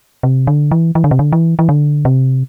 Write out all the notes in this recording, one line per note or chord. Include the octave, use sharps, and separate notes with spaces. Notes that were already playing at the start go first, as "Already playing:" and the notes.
C3
D3
E3
E3
D3
C3
D3
E3
E3
D3
C3